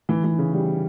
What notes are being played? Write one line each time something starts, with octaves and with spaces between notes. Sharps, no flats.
E3
E3
C#3
G3